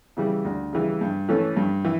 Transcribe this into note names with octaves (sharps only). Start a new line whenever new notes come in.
C#3 E3 G3
D2
C#3 E3 G3
G2
E3 A3 C#4
G2
E3